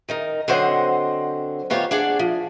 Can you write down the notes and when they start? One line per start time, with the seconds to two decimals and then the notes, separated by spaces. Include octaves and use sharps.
0.09 D#3 D#4 A#4
0.48 D3 F#3 C4 C5 D#5 F#5
1.70 D#3 B3 F4 G4 C5 C#5
1.91 D4 G#4 D5 F#5
2.19 F3